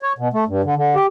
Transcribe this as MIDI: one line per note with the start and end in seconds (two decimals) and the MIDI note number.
0.02 0.13 73
0.18 0.28 47
0.33 0.44 57
0.48 0.62 43
0.64 0.74 50
0.76 0.95 50
0.95 1.06 67